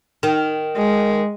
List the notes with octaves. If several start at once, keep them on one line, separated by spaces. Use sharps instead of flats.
D#3
G#3